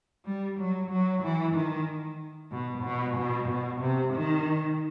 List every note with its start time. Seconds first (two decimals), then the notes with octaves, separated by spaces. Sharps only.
0.25 G3
0.59 F#3
0.91 F#3
1.22 E3
1.55 D#3
2.51 B2
2.84 B2
3.17 B2
3.48 B2
3.80 C3
4.13 D#3